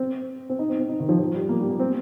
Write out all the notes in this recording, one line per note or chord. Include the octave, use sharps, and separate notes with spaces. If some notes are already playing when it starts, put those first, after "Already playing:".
Already playing: C4
C4
D#4
C4
C4
D#4
D#3
F3
F3
G3
A#3
G3
A#3
C4